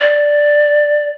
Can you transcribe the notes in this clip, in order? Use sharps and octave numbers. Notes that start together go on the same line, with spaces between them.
D5